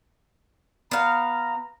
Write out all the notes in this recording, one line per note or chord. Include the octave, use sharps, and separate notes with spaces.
B3 F5 A#5